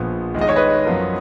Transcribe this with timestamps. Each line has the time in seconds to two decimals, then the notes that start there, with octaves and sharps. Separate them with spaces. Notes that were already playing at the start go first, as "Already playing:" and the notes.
Already playing: A#1 A#2 F3 B3
0.34 D#2 D#3 G#3
0.41 D#5
0.49 C#5
0.56 B4 D#5
0.85 F#2 F3 B3 F4 A#4